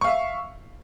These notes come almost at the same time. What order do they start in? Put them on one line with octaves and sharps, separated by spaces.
C#6 F5 E5